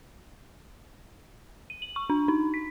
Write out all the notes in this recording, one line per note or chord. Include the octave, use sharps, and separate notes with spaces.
D#7
F#7
C#6
D4
D#4
B6